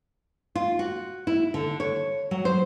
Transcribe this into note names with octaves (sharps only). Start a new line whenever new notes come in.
F4
F#4
E4
D3
C#5
F#3
C5